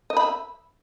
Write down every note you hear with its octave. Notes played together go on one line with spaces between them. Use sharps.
D#5
B5
E5